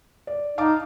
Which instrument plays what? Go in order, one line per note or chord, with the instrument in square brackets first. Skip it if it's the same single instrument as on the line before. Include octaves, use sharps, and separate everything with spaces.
[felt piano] D5
[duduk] D#4 [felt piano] F5 A5 D6